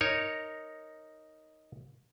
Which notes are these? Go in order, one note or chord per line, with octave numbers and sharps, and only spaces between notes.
D#4 A#4 C#5